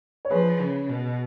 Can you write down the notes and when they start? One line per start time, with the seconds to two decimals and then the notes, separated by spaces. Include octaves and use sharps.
0.25 C#5
0.30 F3 G#4 B4
0.61 C#3
0.89 B2